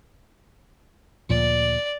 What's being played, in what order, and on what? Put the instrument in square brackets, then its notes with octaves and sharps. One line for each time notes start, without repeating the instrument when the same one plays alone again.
[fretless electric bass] D2 A#2 F3 [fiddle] D5